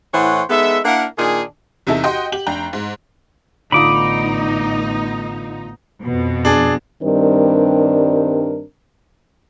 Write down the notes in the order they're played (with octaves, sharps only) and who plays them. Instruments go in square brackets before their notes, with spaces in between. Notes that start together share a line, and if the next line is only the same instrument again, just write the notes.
[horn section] A2 E3 C5 C#5 F#5
G#3 B3 D#4 A4 E5
A#3 D4 E4 A#4 F5 F#5
A#2 D#3 D4 D#4 G#4
[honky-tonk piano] E2 C3 D#4 E4 A4
F#4 G4 D#5 F#5 G5 C6
G4 F#7
F1 D4 G5 A#5
G#2
[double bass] A1 B3 [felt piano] D3 F4 D#6 [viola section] D#4 [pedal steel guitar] B5 D6
[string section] F2 B2
[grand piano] D4 G#4
[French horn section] G2 D#3 G3 C4 D4 A#4